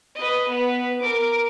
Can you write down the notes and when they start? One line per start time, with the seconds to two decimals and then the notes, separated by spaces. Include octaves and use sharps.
0.15 B4 D#5
0.47 B3 B4
1.00 A#4 D6